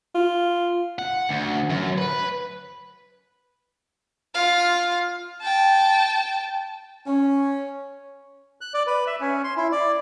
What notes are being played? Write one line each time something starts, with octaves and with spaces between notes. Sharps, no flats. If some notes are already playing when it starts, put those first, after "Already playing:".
F4
F#5
D2
F#2
B4
F4 F5
G5 A5
C#4
F#6
D5
B4
E5
C#4
C6
E4
D5